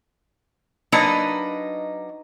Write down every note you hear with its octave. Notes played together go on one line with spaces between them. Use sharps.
F#3 A#3 D4 D#4 B4 D#5